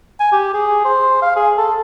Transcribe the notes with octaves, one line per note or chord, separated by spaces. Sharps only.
G#5
G4
G#4
C5
F5
G#4
A4